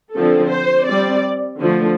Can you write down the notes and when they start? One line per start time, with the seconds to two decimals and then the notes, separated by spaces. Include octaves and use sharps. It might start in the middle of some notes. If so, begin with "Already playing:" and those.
0.15 D3 F3 C4 A4
0.51 C5
0.88 G3 C4 D5
1.61 D3 F3 A3